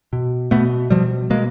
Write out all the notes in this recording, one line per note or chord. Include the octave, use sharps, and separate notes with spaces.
B2
B2 A3 B3
B2 F3 G3
B2 G#3 A#3